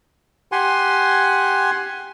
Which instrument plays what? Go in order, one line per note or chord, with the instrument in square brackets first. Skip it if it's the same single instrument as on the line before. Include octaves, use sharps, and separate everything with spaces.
[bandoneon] G4 F#5 G#5 C6